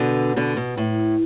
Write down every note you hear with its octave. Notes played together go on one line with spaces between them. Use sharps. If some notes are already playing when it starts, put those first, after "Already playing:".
Already playing: B2 D3
B2 D3
B2
A2